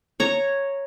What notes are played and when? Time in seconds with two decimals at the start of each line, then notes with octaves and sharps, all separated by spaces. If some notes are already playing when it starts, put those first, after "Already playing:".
0.20 C#5 A#5